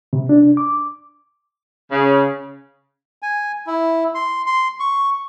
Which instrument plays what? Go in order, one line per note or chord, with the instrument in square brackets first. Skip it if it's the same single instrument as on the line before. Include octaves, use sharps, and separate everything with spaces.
[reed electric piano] C3
D4
D6
[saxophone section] C#3
[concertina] G#5
E4
C6
C6
C#6